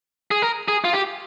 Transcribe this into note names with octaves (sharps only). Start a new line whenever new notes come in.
G#4
A#4
G#4
F4
G4